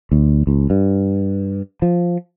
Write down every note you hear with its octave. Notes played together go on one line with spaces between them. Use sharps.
D2
C#2
G2
F3